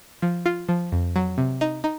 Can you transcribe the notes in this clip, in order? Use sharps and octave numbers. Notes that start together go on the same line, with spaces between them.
F3
F4
F3
F2
F#3
C3
D#4
D#4